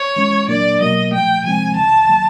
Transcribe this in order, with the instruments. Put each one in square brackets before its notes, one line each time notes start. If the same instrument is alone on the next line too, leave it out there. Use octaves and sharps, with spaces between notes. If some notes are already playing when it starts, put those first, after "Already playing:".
Already playing: [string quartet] C#5
[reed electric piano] E3 G#3 C#4
[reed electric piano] A#2 F#3 A#3 D4 [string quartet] D5
[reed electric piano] B2 F#3 A#3 [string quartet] D#5
[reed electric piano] A#2 F3 A3 [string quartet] G5
[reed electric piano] C3 F3 G#3 C4 [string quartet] G#5
[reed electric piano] C#2 C#3 E3 [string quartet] A5
[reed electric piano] D#3 F#3 A#3